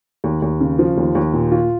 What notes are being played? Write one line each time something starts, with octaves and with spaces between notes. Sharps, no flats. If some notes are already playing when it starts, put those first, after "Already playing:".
D#2
D#2
C#3
F3
D#2
D#2
A#2
F4